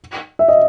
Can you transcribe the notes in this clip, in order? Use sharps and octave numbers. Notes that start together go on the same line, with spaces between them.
E5
D#5